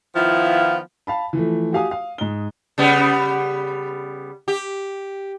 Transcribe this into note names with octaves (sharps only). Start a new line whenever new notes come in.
D#3 F3 B3 E4 F4
F5 A5 B5
E3 F3 A3
F#4 G4 F5 G#5 D#6
F5
G#2 G7
C#3 G3 B3
G4